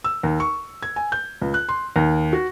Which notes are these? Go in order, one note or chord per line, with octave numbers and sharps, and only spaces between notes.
E6
D#2
C#6
G#6
G#5
G6
C#2
F#6
C6
D#2
F#4